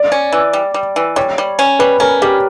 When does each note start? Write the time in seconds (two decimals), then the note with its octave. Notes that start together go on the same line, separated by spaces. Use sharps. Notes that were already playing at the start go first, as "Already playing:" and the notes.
Already playing: D5
0.12 C#4
0.32 E3
0.53 G3
0.74 G3
0.96 E3
1.16 G3 C#5
1.38 G3
1.59 C#4
1.79 G3 B4
2.00 C#4 A#4
2.22 G3 G4